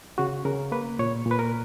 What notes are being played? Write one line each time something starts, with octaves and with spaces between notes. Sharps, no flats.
C#3 F#4
C#3 A#4
A#3 B4
A#2 C#5
A#2
B4
A#4